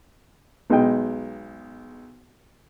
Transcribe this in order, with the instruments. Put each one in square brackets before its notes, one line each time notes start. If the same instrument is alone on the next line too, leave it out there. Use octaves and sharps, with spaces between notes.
[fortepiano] B1 G#3 D#5 G5